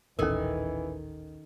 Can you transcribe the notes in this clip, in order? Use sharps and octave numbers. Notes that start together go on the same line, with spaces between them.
D#1 A1 D#3 E3 C#4 A4 A#4 G#5